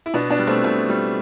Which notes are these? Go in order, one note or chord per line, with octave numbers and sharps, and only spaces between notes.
E4
B2 B3 D4
B3 D4
G3
A3 C4
B2 A3
G3